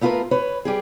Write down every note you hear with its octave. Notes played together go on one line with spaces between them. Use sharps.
A3 B3 F4 G4 A#4 B4
B4 C#5
G3 G4 G#4